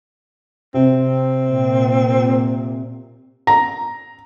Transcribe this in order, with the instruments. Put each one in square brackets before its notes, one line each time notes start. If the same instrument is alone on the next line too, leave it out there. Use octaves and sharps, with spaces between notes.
[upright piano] C3 [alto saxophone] C4
[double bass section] A#2
[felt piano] A#5